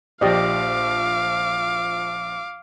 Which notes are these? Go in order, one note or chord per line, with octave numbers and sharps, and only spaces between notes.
A#1 F3 G4 D5 D#5 F5 D6